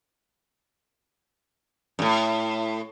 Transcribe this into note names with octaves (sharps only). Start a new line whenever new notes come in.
F#2 A2